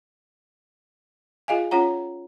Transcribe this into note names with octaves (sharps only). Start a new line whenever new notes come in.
F4 G#4 D#5 F5 G#5
C#4 F4 C#5 F#5 A#5